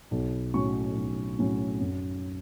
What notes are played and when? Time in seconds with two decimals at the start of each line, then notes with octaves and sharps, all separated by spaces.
0.11 B1
0.54 A2 F#3 C#4 C#6
0.96 B1
1.39 A2 F#3 C#4
1.81 F#2